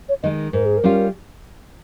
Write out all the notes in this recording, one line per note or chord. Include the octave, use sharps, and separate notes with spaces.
C#5
D#3 G#3 D#5
G#2 A#4
G#4
A#4
G3 C#4 F4